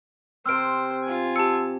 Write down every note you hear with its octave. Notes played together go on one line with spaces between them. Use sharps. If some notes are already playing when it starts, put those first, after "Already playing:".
C3 C4 C5 E6 F6 D7
F4 G#5
G4 A5 E6 C#7